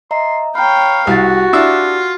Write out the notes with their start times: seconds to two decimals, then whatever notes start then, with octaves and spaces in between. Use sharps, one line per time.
0.11 D#5 E5 A#5 C6
0.55 C#5 F5 G5 A#5 B5
1.07 C2 F#4 G4 A6
1.53 D4 E4 F4 E5